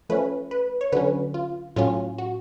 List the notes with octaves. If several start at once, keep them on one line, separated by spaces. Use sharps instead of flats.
F3 A3 C#4 B4
B4
C#5
D3 F#3 C#4 B4
F4
A2 F#3 C#4 F4
F#4